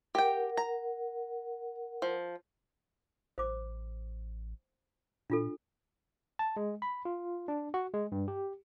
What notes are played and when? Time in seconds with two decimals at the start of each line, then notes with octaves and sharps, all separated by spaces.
0.15 G4 A#4 F#5 G5
0.57 A#5
2.02 F3
3.38 A1 C5 D6
5.30 A#2 D4 F4 A4
6.39 A5
6.56 G#3
6.82 B5
7.05 F4
7.48 D4
7.74 F#4
7.94 G#3
8.12 G2
8.28 G4